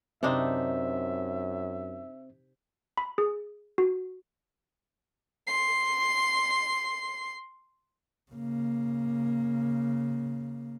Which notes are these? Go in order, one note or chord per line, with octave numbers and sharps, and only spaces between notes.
F#2 C3 C4 D4 D#4 C5 E5
B5
G#4
F#4
C6 C7
C#3 A#3